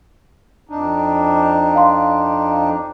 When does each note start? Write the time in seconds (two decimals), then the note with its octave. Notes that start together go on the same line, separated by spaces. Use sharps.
0.69 F2 D4 D#4
1.75 F5 C6